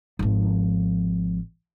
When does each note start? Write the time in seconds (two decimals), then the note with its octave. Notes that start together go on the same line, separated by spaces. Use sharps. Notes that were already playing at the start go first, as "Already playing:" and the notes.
0.19 G#1 F3